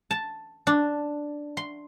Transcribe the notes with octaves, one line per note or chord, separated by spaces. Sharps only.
A5
D4
C6